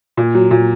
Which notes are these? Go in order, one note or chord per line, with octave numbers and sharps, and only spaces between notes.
A#2
F#3
A#2